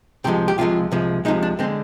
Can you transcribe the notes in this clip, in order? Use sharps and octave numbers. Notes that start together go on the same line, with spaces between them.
C2 C3 F3 G#3 G4
G4
C2 C3 F3 G#3 F4
C2 C3 F3 G#3
C2 C3 F3 G#3 D#4
D4
D3 G#3 C4